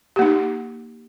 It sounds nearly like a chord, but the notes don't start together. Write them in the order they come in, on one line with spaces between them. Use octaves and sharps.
G4 A#3 D#4